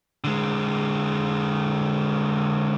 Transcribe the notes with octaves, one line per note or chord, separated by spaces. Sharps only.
D3 G#3